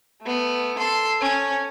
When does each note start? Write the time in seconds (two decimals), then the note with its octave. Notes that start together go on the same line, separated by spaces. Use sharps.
0.22 A3 B3
0.78 A4 C6
1.20 C#4